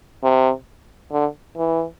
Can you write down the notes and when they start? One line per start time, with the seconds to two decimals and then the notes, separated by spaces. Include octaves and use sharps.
0.23 C3
1.12 D3
1.57 E3